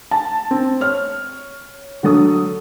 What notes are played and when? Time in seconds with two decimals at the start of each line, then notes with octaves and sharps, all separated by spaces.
0.11 A5
0.51 C4
0.81 C#5 F6
2.03 D3 F#3 A4 D#6